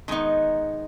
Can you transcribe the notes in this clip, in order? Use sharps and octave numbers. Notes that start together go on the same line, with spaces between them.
D#3 G#3 B3 D#4